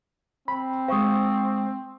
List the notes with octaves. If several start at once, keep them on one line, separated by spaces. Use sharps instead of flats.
C4 B5
G#3 C5 F5 C#6 D#6